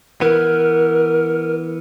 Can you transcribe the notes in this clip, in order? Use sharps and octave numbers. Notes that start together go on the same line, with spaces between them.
E3 B3 A#4